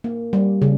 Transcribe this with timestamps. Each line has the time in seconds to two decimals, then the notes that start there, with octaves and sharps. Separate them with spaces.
0.04 A#3
0.33 G3
0.62 C#3